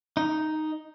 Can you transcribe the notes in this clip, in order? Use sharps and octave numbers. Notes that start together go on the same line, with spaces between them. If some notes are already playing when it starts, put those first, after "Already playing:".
D#4